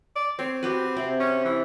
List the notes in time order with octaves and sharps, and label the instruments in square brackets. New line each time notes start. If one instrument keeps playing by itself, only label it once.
[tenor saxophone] D5
[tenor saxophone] C4 [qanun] C#5
[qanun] F#4 G4 B4
C3
[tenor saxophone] C#4
E3